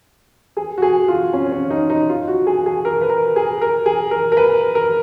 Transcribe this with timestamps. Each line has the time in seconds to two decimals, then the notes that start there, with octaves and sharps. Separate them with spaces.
0.57 G#4
0.78 F#4
0.82 G#4
1.08 F4
1.33 C#4
1.52 C#4
1.70 D#4
1.90 D#4
2.10 F4
2.28 F#4
2.47 G#4
2.66 G#4
2.85 A#4
3.01 B4
3.10 A#4
3.36 G#4
3.61 A#4
3.86 G#4
4.11 A#4
4.32 A#4
4.37 B4
4.75 A#4